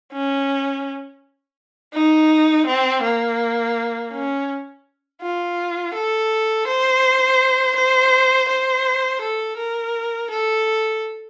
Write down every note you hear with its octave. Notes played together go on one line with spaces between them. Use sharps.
C#4
D#4
C4
A#3
C#4
F4
A4
C5
C5
C5
A4
A#4
A4